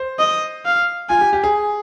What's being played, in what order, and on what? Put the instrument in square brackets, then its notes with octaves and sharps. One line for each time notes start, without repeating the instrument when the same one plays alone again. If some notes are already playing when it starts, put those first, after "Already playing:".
Already playing: [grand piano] C5
[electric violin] D#5
F5
[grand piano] F4 [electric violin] G#5
[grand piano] G4
G4
G#4